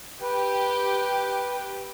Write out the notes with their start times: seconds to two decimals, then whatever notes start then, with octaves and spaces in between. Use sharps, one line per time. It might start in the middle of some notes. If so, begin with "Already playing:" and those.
0.22 G4 B4